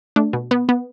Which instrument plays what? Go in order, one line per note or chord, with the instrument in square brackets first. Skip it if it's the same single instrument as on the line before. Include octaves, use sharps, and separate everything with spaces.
[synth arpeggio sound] A3 D4
B2
B3
B3